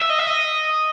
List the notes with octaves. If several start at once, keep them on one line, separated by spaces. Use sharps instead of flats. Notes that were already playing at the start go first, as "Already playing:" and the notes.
E5
D#5
E5
D#5